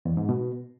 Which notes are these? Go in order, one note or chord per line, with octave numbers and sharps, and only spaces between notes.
E2
G#2
B2